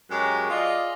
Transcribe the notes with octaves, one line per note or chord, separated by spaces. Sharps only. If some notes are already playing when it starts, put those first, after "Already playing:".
F#2 G#3 F#4 G4 A#4 C#5
F4 G#4 D5 D#5